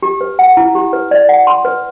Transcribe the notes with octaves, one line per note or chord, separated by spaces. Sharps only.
G4
B4
F#5
E4
G4
B4
D5
F#5
C6
B4